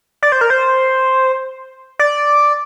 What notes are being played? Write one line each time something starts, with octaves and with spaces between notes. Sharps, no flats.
D5
C5
A#4
C5
D5